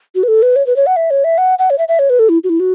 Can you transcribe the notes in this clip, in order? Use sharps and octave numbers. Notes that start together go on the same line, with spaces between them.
F#4
B4
A4
B4
C#5
B4
C#5
F#5
E5
C#5
E5
F#5
F#5
C#5
E5
E5
C#5
B4
A4
E4
F#4
E4
F#4